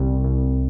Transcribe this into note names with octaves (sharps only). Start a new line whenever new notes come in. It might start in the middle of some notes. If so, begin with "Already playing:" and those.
Already playing: C2
C2